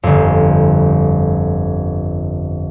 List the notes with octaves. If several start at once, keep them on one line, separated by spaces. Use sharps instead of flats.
G1 F2